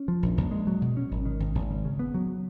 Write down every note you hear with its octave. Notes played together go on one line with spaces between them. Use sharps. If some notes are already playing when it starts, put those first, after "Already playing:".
Already playing: C#4
F3
A#1
A#1
G#3
F#3
B2
C#4
G#1
D#3
G#1
G#1
C#3
C#3
B3
F#3